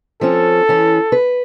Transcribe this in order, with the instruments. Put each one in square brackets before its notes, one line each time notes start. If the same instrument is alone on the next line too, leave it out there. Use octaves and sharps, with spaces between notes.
[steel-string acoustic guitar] F3 C4 C#4 [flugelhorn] A4
[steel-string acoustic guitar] E3 C#4
B4